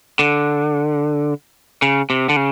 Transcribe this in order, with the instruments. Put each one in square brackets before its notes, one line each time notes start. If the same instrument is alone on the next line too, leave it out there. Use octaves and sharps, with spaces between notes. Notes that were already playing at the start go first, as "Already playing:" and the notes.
[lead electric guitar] D3
C#3
C3
D3
C#3